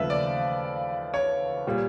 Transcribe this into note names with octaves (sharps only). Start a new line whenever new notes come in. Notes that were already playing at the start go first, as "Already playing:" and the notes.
Already playing: D#2 C#3 F3 A3 B4 E5
D5
C#5
A#2 G3